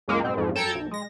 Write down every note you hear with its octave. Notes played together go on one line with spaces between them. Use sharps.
C#2 F#2 G#3 A#3
G#2 B2 C4
F2 G#2
F#2 A4 G5 A5 A#5 G#6
B1
G#3 A#6